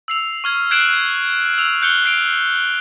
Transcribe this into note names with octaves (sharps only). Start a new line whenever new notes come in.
E6 C7 F7
C#6 F6 G#6
F#6 G#6 C7 D7 E7 F#7
E6 F7
F#6 G6 C#7 G7
F6 C7 D7 F7